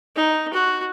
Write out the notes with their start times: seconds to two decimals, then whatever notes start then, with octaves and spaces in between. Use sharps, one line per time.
0.16 D#4
0.53 F#4